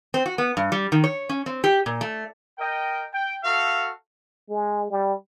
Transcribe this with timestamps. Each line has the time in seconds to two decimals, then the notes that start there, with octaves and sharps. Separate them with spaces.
0.14 C4
0.26 F#4
0.38 B3
0.57 G2
0.72 G3
0.92 D#3
1.04 C#5
1.29 C#4
1.46 C4
1.64 G4
1.86 A#2
2.01 A3
2.58 A#4 D#5 G5
3.12 G5
3.43 F#4 A4 E5 F5
4.49 G#3
4.91 G3